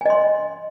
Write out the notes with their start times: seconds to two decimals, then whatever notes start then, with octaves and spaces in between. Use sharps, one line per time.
0.01 G#5
0.06 D#5
0.10 C6